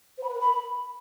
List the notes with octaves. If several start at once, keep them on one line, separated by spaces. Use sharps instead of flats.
C5
B5
B4
A#4
B5